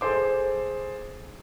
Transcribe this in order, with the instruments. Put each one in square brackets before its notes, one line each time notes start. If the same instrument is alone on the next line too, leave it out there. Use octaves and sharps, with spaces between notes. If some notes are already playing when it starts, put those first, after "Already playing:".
[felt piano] G#4 A4 C5 D6